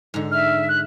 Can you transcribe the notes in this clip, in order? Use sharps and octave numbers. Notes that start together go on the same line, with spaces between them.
G#2 D3
E5 F6
F#6